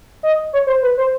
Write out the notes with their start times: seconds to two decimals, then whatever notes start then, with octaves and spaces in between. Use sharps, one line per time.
0.23 D#5
0.53 C#5
0.67 C5
0.83 B4
0.97 C5